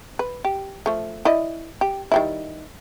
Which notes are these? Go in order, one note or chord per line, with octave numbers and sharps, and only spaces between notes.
B4
G4
F3 A3
E4 D5 D#5
G4
D#3 G3 E4